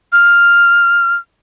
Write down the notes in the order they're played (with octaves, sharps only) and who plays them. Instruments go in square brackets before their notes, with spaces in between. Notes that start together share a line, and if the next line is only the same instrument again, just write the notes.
[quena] F6